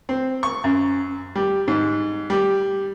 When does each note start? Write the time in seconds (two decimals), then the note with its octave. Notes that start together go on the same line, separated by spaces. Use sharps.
0.09 C4
0.43 C#6
0.64 F#2
1.35 G3
1.68 G#2
2.30 G3